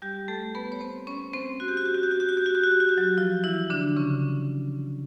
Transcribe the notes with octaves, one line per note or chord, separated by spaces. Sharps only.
G3 G4
A3 A4
B3 B4
C#5
C4 C5
C#4 C#5
C4 C5
F#4
G4
F#4
G4
F#4
G4
F#4
G4
F#4
G4
F#4
G4
F#4
G4
F#4
G4
F#3 F#4
F3 F4
E3 E4
D3 D4
C#3 C#4